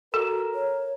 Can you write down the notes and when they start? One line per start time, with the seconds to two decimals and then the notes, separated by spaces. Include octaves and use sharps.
0.14 F#4 A4 A#4
0.55 C#5